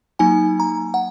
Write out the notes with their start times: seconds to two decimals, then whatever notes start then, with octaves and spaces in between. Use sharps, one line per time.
0.19 F#3 A#3 D#4 G#5
0.60 A#5
0.94 F#5